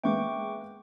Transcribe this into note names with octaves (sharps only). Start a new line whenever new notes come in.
G#3 A#3 B3 E5 G5 C#6 D6